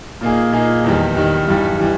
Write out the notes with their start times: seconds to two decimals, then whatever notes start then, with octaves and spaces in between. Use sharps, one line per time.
0.21 A#2 A#3 D#4 G#4
0.53 A#2 A#3 D#4 G#4
0.84 E2 D#3 G3
1.15 E2 D#3 G3
1.47 G2 E3 G3
1.79 E3 G3